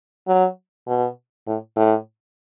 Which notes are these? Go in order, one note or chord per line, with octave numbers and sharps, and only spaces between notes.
F#3
B2
A2
A2